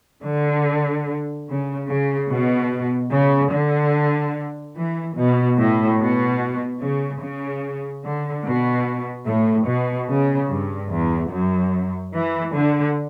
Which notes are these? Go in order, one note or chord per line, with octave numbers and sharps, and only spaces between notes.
D3
C#3
C#3
B2
C#3
D3
E3
B2
A2
B2
C#3
C#3
D3
B2
A2
B2
C#3
G2
E2
F#2
E3
D3